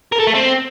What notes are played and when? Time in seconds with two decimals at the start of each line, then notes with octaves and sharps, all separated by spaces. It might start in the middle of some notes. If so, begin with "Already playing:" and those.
0.12 A#4
0.20 A4
0.27 A3
0.34 C4